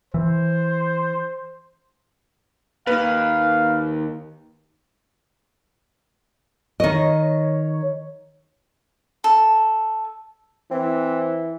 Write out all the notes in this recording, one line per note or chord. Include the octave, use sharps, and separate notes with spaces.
E3 C5
D#2 B4 F5
D#3 C#5 D#5
A4
E3 C4